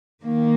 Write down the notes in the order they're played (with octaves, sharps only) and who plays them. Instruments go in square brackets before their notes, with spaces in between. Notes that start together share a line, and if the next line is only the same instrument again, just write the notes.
[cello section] D#3 A#3